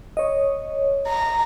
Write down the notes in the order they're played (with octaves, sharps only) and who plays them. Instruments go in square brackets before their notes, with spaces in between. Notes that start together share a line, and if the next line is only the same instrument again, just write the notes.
[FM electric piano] C#5 D#5
[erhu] A#5